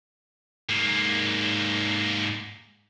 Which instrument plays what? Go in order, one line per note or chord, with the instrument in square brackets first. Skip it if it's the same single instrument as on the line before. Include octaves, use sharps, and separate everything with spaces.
[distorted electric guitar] G#2 A#3